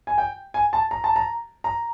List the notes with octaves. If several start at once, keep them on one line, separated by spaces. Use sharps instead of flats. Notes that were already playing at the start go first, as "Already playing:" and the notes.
G#5
G5
G#5
A5
A#5
A5
A#5
A#5